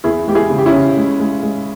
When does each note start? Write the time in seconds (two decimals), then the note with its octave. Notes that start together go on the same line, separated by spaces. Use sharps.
0.04 E2 E4 G#4
0.27 G#3 G4
0.35 E4 G#4
0.50 C#3
0.58 G4
0.66 C#4 E4
0.73 C#3
0.97 G#3
1.20 G#3
1.43 G#3